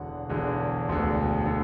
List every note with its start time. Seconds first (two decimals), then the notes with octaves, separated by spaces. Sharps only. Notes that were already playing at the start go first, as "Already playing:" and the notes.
Already playing: E1 E2 D3 F#5
0.30 E1 E2 D3
0.88 E1 D2 D3
1.46 D3